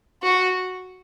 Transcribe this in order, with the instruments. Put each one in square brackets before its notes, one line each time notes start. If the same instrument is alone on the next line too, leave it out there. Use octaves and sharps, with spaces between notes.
[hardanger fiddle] F#4